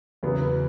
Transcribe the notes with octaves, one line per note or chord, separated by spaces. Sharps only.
E2 C#3 F#3 B3